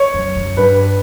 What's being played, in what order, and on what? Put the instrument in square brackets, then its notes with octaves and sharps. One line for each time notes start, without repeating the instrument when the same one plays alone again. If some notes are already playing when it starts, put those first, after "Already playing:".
Already playing: [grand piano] C#5
[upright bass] F#2
F#2
[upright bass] G2 [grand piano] B4